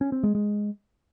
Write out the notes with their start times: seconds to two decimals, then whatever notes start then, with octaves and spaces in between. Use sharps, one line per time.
0.01 C#4
0.12 C4
0.23 G#3
0.35 G#3